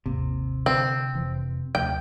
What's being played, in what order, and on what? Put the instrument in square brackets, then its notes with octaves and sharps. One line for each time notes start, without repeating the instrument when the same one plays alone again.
[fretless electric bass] G#1 D#2 A#3 [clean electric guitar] C3
[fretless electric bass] D3 [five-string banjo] C4
[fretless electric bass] E1 F2 E3
[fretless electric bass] D2 C3 F3 [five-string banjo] G5